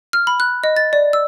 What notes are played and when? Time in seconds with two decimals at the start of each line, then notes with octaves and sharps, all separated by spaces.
0.13 F6
0.27 B5
0.40 F#6
0.64 D#5
0.76 A6
0.93 D5
1.13 E6